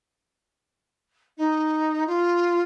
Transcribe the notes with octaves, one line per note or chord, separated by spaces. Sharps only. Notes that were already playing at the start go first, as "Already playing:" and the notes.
D#4
F4